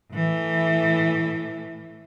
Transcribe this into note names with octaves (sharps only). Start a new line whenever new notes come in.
A2 E3